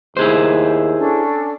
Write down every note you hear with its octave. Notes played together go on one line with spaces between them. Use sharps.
D#2 E4 G#4 C5
C#4 D4 A4